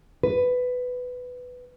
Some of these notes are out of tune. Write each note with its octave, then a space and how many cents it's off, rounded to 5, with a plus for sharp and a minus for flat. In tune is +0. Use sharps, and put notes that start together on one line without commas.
B4 +10